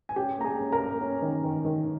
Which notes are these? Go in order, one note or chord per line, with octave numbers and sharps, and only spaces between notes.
G#5
C#4 G4 G5
A#3 A#5
G#4 G#5
C#4
A#4 A#5
A#3
C#4
D#3
D#3
D#3